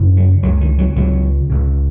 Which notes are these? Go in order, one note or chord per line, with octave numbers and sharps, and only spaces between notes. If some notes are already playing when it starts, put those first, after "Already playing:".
Already playing: G#1 F#2 C#3
F#3
C#2 C#3 F#3
D#3
F#3
C#2 C#3 F#3
C#2 C#3